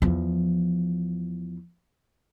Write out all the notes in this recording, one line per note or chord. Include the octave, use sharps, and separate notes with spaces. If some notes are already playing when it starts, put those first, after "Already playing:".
E2 F3